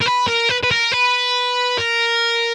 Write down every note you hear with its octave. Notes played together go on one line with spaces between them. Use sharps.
A#4
B4
A#4
B4
B4
A#4
B4
A#4